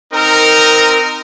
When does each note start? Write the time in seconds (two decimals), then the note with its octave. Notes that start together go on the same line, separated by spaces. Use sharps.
0.13 C4 D#4 A#4